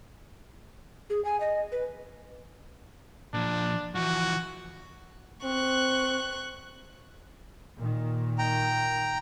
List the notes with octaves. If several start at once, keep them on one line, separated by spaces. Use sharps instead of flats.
G#4
G#5
D#5
B4
A#2 F3 D4
E3 F3 F#4
C4 C#6 F#6
A#2 D#3
G5 A#5